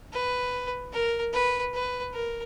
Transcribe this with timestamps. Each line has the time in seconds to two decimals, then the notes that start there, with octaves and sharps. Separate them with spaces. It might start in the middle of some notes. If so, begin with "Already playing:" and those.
0.13 B4
0.93 A#4
1.33 B4
1.73 B4
2.14 A#4